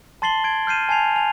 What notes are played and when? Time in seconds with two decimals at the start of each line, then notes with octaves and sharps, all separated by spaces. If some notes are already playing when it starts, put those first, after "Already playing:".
0.22 A5 C6 A6 C7 F#7 G7
0.44 G#6 D7
0.67 F6 G6 C7 D#7 E7
0.89 G#5 A5 G#6 C7 F7
1.16 G#5 F7